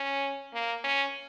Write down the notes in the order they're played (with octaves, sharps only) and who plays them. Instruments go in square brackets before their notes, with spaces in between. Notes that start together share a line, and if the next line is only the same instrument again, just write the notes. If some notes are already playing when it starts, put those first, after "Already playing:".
Already playing: [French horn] C#4
A#3
C#4